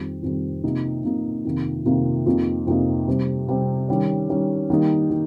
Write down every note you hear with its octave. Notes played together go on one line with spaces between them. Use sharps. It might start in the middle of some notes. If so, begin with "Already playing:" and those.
Already playing: F2 D#3 G3 C4
F2 D#3 G3 C4
C3 F3 A#3 D#4
C3 F3 A#3 D#4
F2 C3 D#3 A#3 F4
F2 C3 D#3 A#3 F4
F2 C3 F3 A#3 D#4
F2 C3 F3 A#3 D#4
C3 G3 C4
C3 G3 C4
D#3 G3 C#4
D#3 G3 C#4
D#3 G3 A#3 D#4
D#3